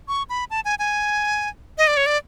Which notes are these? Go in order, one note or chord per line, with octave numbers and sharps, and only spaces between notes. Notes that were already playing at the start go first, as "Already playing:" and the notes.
C#6
B5
A5
G#5
G#5
D#5
D5
C#5
D5